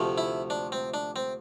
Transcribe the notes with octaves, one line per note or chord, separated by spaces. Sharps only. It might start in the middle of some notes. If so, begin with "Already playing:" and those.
Already playing: D2 C3 F3 A3
E4
D4
C4
D4
C4